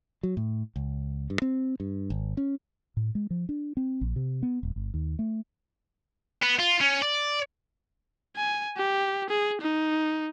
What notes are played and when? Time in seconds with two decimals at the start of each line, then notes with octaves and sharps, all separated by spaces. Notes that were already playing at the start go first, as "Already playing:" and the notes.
0.23 F#3
0.37 A2
0.76 C#2
1.30 G2
1.42 C4
1.80 G2
2.10 G#1
2.37 C#4
2.97 A2
3.15 G#3
3.30 F3
3.49 D4
3.77 C4
4.01 A#1
4.16 C3
4.43 B3
4.63 D#1
4.76 G1
4.94 D#2
5.19 A3
6.42 B3
6.59 F4
6.81 C#4
7.02 D5
8.36 G#5
8.77 G4
9.29 G#4
9.61 D#4